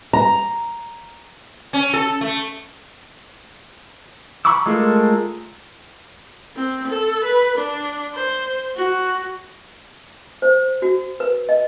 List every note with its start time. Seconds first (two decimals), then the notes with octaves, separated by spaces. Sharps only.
0.13 A#5
1.73 C#4
1.94 A4
2.21 A3
4.45 A#5 B5 C#6 D6 E6
4.66 G#3 A3 F4 A4 A#4
6.56 C4
6.88 A4
7.24 B4
7.58 D4
8.14 C5
8.76 F#4
10.42 C5
10.82 F#4
11.20 B4
11.49 D#5